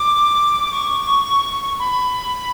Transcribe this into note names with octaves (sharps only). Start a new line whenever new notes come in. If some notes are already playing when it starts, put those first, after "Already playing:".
Already playing: D6
D6
C#6
B5